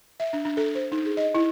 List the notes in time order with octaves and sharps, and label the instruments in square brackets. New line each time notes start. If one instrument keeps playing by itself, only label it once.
[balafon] E5
D4
D4
A4
C5
D#4
G#4
D#5
E4